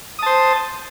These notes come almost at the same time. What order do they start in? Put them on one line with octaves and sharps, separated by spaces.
D#6 A5 C5